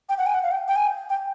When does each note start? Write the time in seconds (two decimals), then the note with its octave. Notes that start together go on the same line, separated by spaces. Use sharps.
0.09 G5
0.18 F#5
0.26 G#5
0.34 F#5
0.43 F5
0.52 G5
0.68 G5
0.76 G#5
1.10 G5